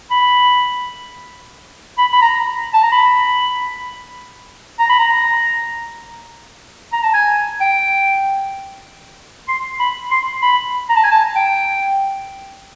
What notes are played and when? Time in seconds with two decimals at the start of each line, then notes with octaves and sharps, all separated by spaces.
0.11 B5
1.98 B5
2.13 B5
2.22 A#5
2.74 A5
2.83 A#5
2.92 B5
4.79 A#5
4.89 B5
4.99 A#5
6.93 A#5
7.03 A5
7.14 G#5
7.61 G5
9.48 C6
9.79 B5
10.11 C6
10.42 B5
10.89 A#5
10.96 A5
11.04 G#5
11.11 A5
11.36 G5